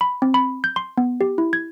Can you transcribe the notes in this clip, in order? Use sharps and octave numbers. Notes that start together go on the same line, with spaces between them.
B5
C4
B5
G6
C6
B3
G4
E4
G#6